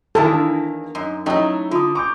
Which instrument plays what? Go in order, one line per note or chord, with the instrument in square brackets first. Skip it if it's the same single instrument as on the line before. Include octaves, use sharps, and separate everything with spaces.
[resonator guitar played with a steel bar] E2 D#3 A#3 [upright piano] E4 A5 [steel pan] A4 [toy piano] C5 G#5
[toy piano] D4 D#4
[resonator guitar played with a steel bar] F#2 [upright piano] D#4
[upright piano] F#3 D#4 [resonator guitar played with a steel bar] A3 E4 [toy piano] C#4
[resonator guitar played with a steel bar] D3 [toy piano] F4 D#6
[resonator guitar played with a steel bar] A#5 [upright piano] C#6 D6 G6